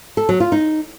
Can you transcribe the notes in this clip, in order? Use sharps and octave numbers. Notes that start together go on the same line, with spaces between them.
A4
F#3
F4
D#4